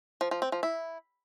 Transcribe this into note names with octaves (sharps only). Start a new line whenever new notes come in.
F3
F3
C4
F3
E4